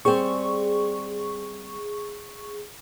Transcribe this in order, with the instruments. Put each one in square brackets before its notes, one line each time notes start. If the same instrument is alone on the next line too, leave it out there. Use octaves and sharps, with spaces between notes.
[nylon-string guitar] G3 C4 [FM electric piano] G#4 C#6